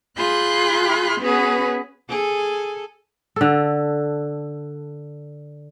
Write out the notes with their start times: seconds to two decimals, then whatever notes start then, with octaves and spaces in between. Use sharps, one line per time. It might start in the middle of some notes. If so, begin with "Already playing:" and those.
0.17 F4 G#4 B5 C6 F#6 G6
1.20 B3 C#4 F#4 G#4 B4
2.09 G#4 A4
3.36 D3 A4